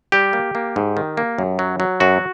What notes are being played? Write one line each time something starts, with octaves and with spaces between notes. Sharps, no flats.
G3 G4
A#3
A#3
G#2
D#3
A#3
F#2
F#3
F#3
F#2 F#4